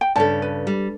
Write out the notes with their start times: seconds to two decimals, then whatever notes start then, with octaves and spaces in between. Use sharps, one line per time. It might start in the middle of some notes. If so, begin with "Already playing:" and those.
0.01 G5
0.16 G2 C#3 A4 A5
0.42 B4
0.67 G3